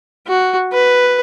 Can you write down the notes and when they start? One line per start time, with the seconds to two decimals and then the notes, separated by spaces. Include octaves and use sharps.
0.27 F#4
0.72 B4